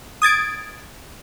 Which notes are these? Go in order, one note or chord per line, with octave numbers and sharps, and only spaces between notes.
D#6 G#6 A6 D7